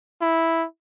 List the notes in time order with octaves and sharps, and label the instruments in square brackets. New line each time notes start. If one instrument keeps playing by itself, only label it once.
[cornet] E4